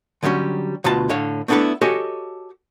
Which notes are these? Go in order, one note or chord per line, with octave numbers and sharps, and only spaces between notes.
D3 F#3 G3 C4 C#4
D2 B2 F4 B4 A5
A2 D3 C#5 F5
A3 B3 D4 E4 A4 B4
F#4 G4 A4 C#5 D#5 G#5